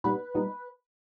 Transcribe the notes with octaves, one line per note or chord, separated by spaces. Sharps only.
A#2 G3 B3 D#4 B4
A#2 G3 B3 D#4